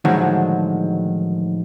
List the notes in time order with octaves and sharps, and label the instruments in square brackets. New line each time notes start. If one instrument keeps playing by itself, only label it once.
[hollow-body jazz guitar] A2 D3 D#3 F3 F#3 G#3